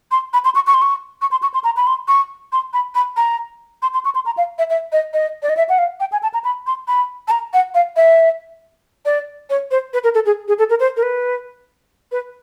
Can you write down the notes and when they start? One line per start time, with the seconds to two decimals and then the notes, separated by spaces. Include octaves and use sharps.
0.11 C6
0.33 B5
0.45 C6
0.55 C#6
0.67 C#6
0.74 C6
0.81 C#6
1.21 C#6
1.31 C6
1.42 C#6
1.54 C6
1.64 A#5
1.76 B5
1.87 C6
2.08 C#6
2.52 C6
2.73 B5
2.95 B5
3.17 A#5
3.82 C6
3.94 C6
4.05 C#6
4.15 C6
4.26 A#5
4.37 F5
4.58 E5
4.70 E5
4.92 D#5
5.13 D#5
5.42 D5
5.49 D#5
5.57 E5
5.69 F#5
5.78 F5
6.00 G5
6.12 G#5
6.23 A5
6.34 A#5
6.44 B5
6.67 C6
6.88 B5
7.28 A5
7.31 A#5
7.53 F#5
7.74 F5
7.96 E5
9.05 D5
9.50 C#5
9.71 C5
9.93 B4
10.04 A#4
10.14 A4
10.26 G#4
10.48 G#4
10.58 A4
10.70 A#4
10.80 C5
10.97 A#4
11.03 B4
12.12 B4